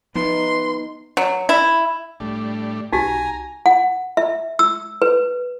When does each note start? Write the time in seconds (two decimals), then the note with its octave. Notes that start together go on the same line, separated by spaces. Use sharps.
0.16 F3 B3 D#4 B4 C6
1.17 F#3
1.49 E4
2.20 A2 G3 A3 D4
2.93 B1 D#4 F#4 G4 G#5 A#5
3.66 F#5
4.17 E5
4.59 E6
5.02 B4